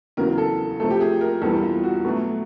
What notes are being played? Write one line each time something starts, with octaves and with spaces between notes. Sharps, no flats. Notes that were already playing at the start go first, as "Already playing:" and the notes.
E2 C#3 F#3 A#4
A4
C3 F3 A3 A4
G4
G#4
A#4
E2 B2 G3 A4
F4
F#4
B2 F#3 A3